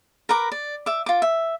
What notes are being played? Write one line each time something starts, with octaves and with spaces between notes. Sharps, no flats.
A#4 B4 A#5 D6
D5
E5 D6
F4 D6
E5